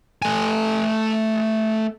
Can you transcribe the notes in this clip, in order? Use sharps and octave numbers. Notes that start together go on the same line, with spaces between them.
A3 G#5